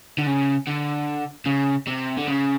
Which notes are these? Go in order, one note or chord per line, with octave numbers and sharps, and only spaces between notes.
D3
C#3
D3
C#3
C3
D3
C#3